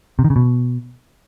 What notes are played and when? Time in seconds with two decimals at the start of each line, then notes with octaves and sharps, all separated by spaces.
0.19 C3
0.24 D#3
0.30 C#3
0.36 B2